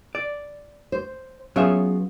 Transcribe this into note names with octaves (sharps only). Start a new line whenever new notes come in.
D5
C5
F#3 B3 C#4 F4 G#4 E5